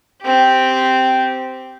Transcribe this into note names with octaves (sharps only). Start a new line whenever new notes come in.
C4 G4